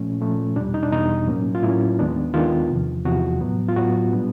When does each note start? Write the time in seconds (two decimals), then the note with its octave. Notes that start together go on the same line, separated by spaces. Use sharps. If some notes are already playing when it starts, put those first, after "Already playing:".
Already playing: A#2 F3 A3 C#4
0.21 A#2 F3 A3 C#4
0.56 E2 B2 G3 D4
0.74 D#4
0.83 D4
0.92 E2 B2 G3 D#4
1.28 A2 F#3 A#3 C#4
1.55 F4
1.63 A2 F#3 A#3 C#4 E4
1.99 D#2 D#3 G#3 B3 D4
2.34 D#2 D#3 G#3 B3 D4 F4
2.70 E2 C3 F3
3.05 E2 C3 F3 F#4
3.41 A2 F#3 B3
3.68 F4
3.76 A2 F#3 B3 F#4
4.12 A#2 G3 B3 D4